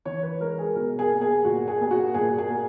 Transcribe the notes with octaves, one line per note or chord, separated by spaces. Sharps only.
E3 C#5
B4
G#3 A#4
G#4
B2 A#4
G#4
A#3
G#4
A#2 F#4
G#4
A#3 G#4
F#4
A#2 G#4
G#4
A#3